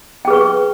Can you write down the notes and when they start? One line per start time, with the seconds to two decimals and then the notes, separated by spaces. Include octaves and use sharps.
0.25 G5
0.28 G#4
0.30 B4
0.33 C#6